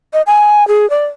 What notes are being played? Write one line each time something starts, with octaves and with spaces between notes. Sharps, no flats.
D#5
G#5
G#4
D5